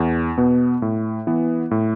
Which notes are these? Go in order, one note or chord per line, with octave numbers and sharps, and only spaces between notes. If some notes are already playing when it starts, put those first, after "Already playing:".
Already playing: E2
B2 B3
A2
E3 B3
A2